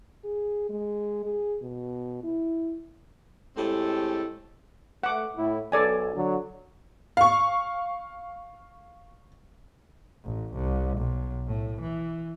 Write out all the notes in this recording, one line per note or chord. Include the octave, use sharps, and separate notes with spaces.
G#4
G#3
G#4
B2
E4
A2 G#3 C4 G4 A4
A3 F#5 D6
A2 E4
B1 A4 D5 G#5
D3 F#3
F5 C#6
A1
C2
B1
A2
E3